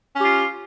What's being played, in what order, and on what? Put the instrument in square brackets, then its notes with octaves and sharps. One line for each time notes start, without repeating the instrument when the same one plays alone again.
[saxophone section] C#4
G4
F4